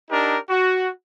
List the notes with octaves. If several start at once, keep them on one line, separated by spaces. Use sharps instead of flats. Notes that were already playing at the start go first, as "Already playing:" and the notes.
D4 D#4 G4 A#4
F#4